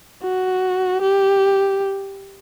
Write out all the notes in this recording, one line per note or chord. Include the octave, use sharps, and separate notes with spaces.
F#4
G4